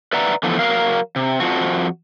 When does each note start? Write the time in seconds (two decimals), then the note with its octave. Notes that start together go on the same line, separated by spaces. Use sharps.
0.13 B4 D5 E5 F#5 A#5
0.43 D3 E3 F3 A3 B3
0.59 F#3 A#4 F5
1.16 C3
1.40 F2 A#2 F3 F#4